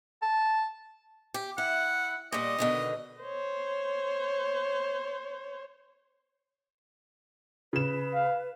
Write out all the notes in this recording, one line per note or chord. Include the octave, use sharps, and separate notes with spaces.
A5
G4
E4 F#5
A#2 G3 D#5
B2 D3 D#3
C5 C#5
C#3 B4 E7
F5